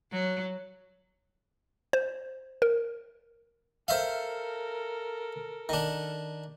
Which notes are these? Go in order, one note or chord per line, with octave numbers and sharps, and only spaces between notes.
F#3
C5
A#4
A4 A#4 C5 E5 F5
D#3 D4